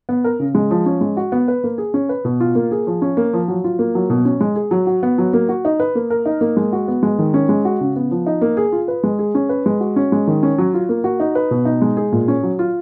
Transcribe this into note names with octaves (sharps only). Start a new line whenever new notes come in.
B3
A#4
C#3
G#3
F3
C#4
G#3
F#4
B3
B4
A#3
G#4
C#4
B4
B2
F4
A#3
G#4
F3
C#4
A#3
F3
F#3
F4
A#3
F#3
B2
C#4
G#3
G#4
F#3
F#4
B3
F#3
A#3
F#4
D#4
B4
A#3
A#4
D#4
A#3
G#3
F#4
B3
G#3
D#3
C#4
G#3
F#4
C#3
B3
F3
D#4
A#3
G#4
F4
B4
G#3
G#4
C#4
B4
G#3
F#4
C#4
G#3
D#3
C#4
F#3
F4
A#3
F#4
D#4
B4
B2
D#4
G#3
G#4
A#2
C#4
F#3
F4